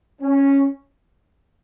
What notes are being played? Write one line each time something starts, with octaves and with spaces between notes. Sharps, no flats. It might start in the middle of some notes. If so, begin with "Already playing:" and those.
C#4